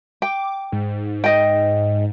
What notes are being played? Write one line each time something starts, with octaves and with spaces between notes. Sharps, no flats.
G5 D6
G#2
D#4 D#5 G5